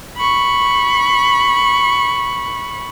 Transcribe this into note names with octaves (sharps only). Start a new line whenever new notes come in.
B5 C#6